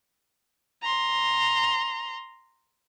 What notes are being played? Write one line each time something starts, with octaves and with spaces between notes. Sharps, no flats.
A#5 C6